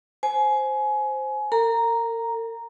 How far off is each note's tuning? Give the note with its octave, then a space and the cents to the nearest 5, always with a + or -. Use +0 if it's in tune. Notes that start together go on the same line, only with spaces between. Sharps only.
C5 +0 G#5 +25
A#4 -40 A#5 +0